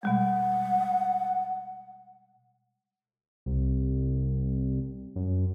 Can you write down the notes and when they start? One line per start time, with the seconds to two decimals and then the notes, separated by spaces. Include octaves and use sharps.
0.03 B2 G3 G#3 F#5
3.46 C2
5.16 F#2